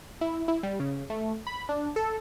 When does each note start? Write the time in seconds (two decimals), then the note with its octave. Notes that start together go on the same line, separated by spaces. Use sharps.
0.21 E4
0.48 E4
0.63 G3
0.80 C#3
1.10 A3
1.47 B5
1.69 D4
1.96 A4